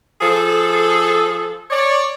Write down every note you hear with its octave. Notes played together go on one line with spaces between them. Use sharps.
F3 G#4 A4
C#5 D5